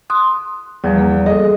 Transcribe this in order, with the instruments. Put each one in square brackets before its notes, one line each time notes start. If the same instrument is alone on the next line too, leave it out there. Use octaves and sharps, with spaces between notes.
[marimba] C6 D#6 F#6
[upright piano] E2 [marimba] E3 F3 G3
[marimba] A#3
[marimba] G#4 A4 [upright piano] D#5